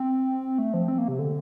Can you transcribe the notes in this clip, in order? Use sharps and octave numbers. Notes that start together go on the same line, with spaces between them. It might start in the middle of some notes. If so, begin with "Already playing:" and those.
Already playing: C4
A3
F3
C4
A#3
C3
D3